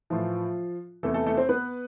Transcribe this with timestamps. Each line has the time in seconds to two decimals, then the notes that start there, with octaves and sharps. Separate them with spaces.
0.10 A2 E3 F3 F4
1.03 E2 C3 E3 A3 A4
1.14 A3 A4
1.26 A3 A4
1.37 C4 C5
1.49 B3 B4